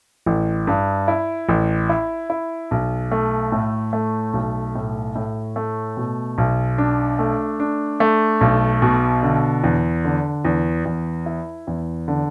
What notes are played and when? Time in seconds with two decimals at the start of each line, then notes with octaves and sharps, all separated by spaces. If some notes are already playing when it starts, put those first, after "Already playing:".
0.26 A1
0.67 G2
1.08 E4
1.49 A1
1.90 E4
2.30 E4
2.71 B1
3.12 A3
3.52 A2
3.93 A3
4.33 B1
4.75 A2
5.15 A2
5.56 A3
5.97 B2
6.38 B1
6.78 D4
7.19 A3
7.60 D4
8.00 A3
8.41 B1
8.82 B2
9.23 D3
9.64 E2
10.05 D3
10.45 E2
10.85 E2
11.26 E4
11.67 E2
12.08 D3